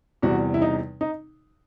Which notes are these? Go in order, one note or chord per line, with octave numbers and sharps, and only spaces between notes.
E2 C3 E3 G3 F#4
E4
D#4
D#4